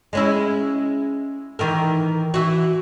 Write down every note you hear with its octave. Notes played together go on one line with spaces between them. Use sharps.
G#3 C#4 E4
D#3 E3 A#4
E3 F#4